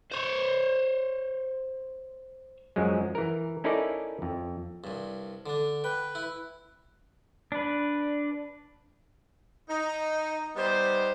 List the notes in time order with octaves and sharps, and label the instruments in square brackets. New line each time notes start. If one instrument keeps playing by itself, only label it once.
[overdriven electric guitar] C5 C#5
[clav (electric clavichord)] F#2 F3 F#3 G#3
E3 A#4
C#4 D#4 E4 A4 A#4 D5
F2
[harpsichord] C2 G2
D3 D4
[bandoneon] B4 [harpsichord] G5
[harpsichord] E4
[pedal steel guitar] D4 B4
[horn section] D#4
G3 B3 D#4 G4 C5